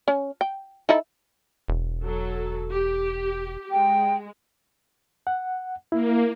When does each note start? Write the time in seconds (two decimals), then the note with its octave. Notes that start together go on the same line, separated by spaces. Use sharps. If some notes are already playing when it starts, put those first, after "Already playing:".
0.08 C#4
0.41 G5
0.89 D#4 E4 A4
1.68 E1
2.04 F#3 A4
2.71 G4
3.71 G#3 G5
5.27 F#5
5.92 A#3 E4